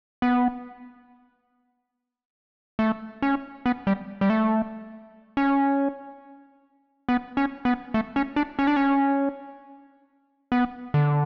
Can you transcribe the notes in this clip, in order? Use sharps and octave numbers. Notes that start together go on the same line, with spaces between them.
B3
A3
C#4
B3
G3
G3
A3
C#4
B3
C#4
B3
A3
C#4
D4
C#4
D4
C#4
B3
D3